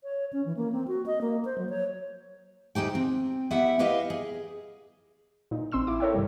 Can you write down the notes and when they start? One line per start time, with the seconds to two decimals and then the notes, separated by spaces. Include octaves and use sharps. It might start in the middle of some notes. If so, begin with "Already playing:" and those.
0.04 C#5
0.33 C#4
0.46 E3
0.57 A#3
0.73 C4
0.88 F#4
1.06 D#5
1.21 A#3
1.45 C5
1.58 F#3
1.69 C#5
2.75 D2 G#3 D#4 G4 G5
2.95 C4
3.51 B3 E4 G4 E5 F#5
3.79 E4 G4 B4 D#5 F5
4.10 G#4
5.51 A#2 D#4
5.72 A1 C4 C6 E6 E7
5.87 E4 D6
6.00 A4 A#4 C#5 E5 G5
6.13 G2 C3 D#3 G3 G#3